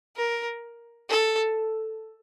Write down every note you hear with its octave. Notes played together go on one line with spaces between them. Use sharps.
A#4
A4